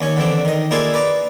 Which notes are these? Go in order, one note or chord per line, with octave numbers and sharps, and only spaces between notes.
D#2 C#4 C#5
D3 E3 C4 D4
D#3 D#5
A#3 D4 E4 F4 G#4 A4
B4 D5 A#5